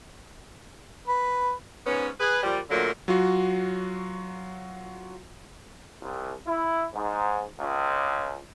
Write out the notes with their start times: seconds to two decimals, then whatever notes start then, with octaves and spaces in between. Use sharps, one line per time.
1.08 B4
1.86 G#2 B3 C#4
2.20 G#4 B4
2.43 A#2 F3 G3
2.70 A#2 D3 F#3 A3 A#3
3.08 F#3 F4 F#4
6.01 C2
6.46 E4
6.94 G#2
7.59 C#2